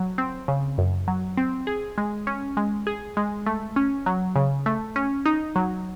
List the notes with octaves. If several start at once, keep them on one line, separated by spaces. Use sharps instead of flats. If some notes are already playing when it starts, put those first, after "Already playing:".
Already playing: F#3
C4
C#3
F#2
F#3
C4
G#4
G#3
C#4
G#3
G#4
G#3
A3
C#4
F#3
C#3
A3
C#4
D#4
F#3